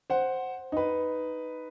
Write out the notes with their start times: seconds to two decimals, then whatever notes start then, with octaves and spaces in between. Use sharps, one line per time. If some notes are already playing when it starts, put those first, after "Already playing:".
0.10 C5 F#5
0.72 D#4 B4